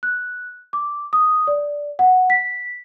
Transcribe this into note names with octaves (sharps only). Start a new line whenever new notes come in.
F#6
D6
D#6
D5
F#5
B6